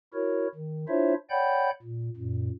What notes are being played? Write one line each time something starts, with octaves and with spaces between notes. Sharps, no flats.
E4 F#4 A#4 C#5
D#3
D4 E4 F4 C5 C#5 E5
C#5 D5 F#5 G5 B5 G6
A#2
F#2 A#2